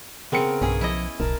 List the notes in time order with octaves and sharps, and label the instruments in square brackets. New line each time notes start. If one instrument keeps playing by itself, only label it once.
[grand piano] C#3 A#4 C#7 [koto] B3 C4
[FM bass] B1 [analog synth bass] G2 [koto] C#4 G#4
[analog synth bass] F3 [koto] E4 D#5
[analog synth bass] D1 [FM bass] B1 [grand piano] A#4 [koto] A5